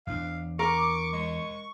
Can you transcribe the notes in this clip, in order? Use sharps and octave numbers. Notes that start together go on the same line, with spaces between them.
E2 D4 F5
A#4 C#6 D6
G#3 C#6